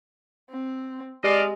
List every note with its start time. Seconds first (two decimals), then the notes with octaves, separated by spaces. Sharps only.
0.50 C4
1.24 G#3 D4 G4 D5 D#5 F5